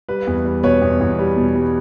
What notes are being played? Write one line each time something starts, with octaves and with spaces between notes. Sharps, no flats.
G3 B4
E2
G3
B2 B4 C#5
E2
E2
G3
B2
G3